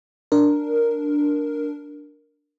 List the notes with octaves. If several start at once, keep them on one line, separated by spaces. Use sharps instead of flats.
D4 A#4